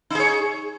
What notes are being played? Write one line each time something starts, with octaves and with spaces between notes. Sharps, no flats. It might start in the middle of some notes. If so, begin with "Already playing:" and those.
D#4 G#4 C#5